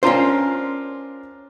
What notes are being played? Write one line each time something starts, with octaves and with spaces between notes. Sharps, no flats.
C#4 D4 F4 A#4 C5